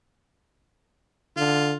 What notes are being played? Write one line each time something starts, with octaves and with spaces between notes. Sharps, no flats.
D3 F4